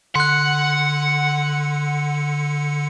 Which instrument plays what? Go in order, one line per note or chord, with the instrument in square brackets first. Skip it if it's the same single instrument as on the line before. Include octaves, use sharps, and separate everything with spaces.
[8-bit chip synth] D3 C#7 [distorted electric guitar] F#5 [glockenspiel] C6 F#6